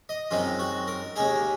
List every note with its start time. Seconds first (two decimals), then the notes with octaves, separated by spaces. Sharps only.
0.09 D#5
0.31 F#2 D#3 G#3 C4 D#4 F4
0.59 F#4
0.88 A#4
1.16 D#2 C#3 G#3 D#4 G#4